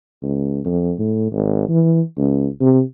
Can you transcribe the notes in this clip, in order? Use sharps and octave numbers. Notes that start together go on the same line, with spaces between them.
C#2
F2
A2
G#1
E3
C#2
C3